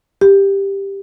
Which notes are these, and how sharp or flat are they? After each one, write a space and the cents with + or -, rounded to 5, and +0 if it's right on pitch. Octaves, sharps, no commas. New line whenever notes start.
G4 +10